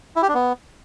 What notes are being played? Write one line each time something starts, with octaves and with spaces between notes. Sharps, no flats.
E4
G4
D4
B3